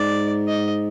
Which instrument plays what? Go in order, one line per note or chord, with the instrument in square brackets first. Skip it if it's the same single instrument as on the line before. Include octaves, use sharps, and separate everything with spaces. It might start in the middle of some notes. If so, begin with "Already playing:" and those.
Already playing: [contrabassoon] G#2 [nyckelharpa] D5
[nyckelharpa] D#5